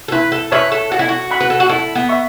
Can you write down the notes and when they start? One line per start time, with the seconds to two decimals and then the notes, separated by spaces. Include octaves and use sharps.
0.08 A4
0.12 E4 B4
0.32 A4
0.52 B4 C#5 E5 C#6
0.72 A4
0.91 F#4 A4
0.99 E4
1.09 F#4
1.31 F#5 B5
1.40 B4
1.50 A4
1.60 F#4
1.69 E4 A4
1.95 B3
2.09 E5 C#6